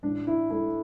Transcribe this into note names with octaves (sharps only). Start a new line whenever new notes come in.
A1 D4
E4
A3 E4